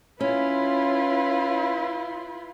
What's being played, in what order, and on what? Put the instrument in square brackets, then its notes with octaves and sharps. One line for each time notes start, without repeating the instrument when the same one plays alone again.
[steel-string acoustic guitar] C#4 [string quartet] E4 F4 B4